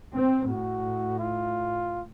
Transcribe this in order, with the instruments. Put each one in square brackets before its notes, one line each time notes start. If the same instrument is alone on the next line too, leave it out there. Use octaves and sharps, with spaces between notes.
[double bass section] C4
[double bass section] A2 [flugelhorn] F#4
[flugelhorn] F4